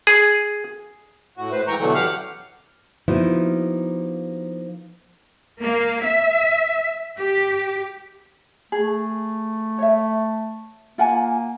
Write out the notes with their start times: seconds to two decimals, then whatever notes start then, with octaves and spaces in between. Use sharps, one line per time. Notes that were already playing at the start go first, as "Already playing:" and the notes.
0.07 G#4
1.37 A2 F#4
1.52 A2 B4 C5
1.68 G#2 E3 G5 A#5 C#6
1.79 B2 D3 E3 F#3 A3
1.94 F#2 G4 F5 F#5 F6
3.08 F3 A#3 B3 D#4 E4 F#4
5.60 A#3
6.03 E5
7.17 G4
8.72 A3 G#4
9.78 C#5 E5
10.98 A#3 F4 F#5 G#5